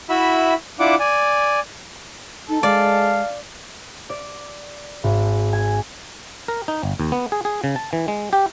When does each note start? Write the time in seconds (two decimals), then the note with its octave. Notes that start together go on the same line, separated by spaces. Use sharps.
0.09 E4 F#4 E5 B5
0.80 D4 E4 F4 F#5 D6
1.00 D5 G#5
2.49 D#4 A4
2.63 G#3 D5 F5
4.09 D5
5.04 G#1
5.53 G#5
6.48 A#4
6.68 D#4
6.83 G1
7.00 D#2
7.12 B3
7.32 G#4
7.45 G#4
7.64 C#3
7.76 A5
7.93 E3
8.08 G#3
8.33 G4